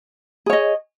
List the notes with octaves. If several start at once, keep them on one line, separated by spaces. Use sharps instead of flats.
G#4 C#5 D#5